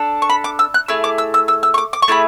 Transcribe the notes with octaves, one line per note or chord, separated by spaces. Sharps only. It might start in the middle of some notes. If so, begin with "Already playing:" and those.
Already playing: D4 A4
C#6
B5
D6
E6
F#6
A3 E4 G#4 E6
D6
E6
E6
E6
E6
C#6
D6
D6
C#6
A3 E4 G#4 B5